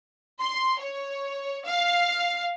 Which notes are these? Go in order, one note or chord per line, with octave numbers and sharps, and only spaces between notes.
C6
C#5
F5